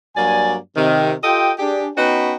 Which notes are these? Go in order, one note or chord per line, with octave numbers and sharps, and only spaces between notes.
G2 F#3 A#3 D5 G#5
C3 D#3
F4 G4 A4 D#5 G5
D4 G4 G#4
B3 C#4 D#4 F#4 B4 G5